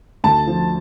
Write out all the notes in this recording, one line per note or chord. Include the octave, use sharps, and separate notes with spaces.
D2 A5
F3